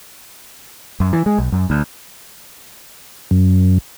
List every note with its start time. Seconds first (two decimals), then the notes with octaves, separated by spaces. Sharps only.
1.00 F#2
1.13 E3
1.26 G#3
1.38 B1
1.52 F#2
1.70 D2
3.31 F#2